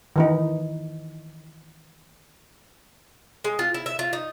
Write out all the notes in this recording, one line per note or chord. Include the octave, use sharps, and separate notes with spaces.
D#3 E3 D#4
G#3
F4
E4
E5
F4
D#4